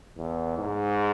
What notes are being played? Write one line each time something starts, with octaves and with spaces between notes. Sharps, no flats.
E2
G#2